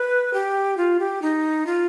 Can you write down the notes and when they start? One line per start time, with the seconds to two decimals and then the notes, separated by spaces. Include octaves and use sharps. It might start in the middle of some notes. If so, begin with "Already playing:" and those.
Already playing: B4
0.33 G4
0.77 F4
1.00 G4
1.22 D#4
1.66 F4